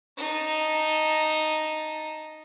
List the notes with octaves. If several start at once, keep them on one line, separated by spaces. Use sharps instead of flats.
D#4 A5